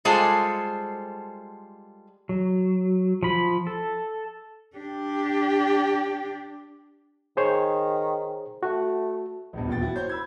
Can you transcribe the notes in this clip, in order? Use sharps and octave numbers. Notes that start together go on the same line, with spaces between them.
G3 G#3 F4 A4 C5 G#5
F#3
F3 B5
A4
D4 G4
D#3 G#4 C5 C#5
A3 F#4
A#1 E2 G2
D#1 E2 A#2 G5 A6
F#3 E4 F#4
C5 C#5 G6
B5 E6 G#6